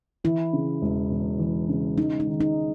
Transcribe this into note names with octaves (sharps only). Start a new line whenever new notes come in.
E3 E4
C#3
E1
E2
E3
C#3
G#3 D#4
D#4
D#3
D#4